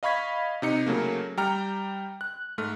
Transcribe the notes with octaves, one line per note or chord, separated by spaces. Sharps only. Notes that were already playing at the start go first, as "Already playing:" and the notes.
D#5 F5 B5 C#6 G#6 B6
C3 D#4 C#7
C#3 F#3 A3 A#3
G3 G5 A#5 F6
F#6
G#2 A3 F6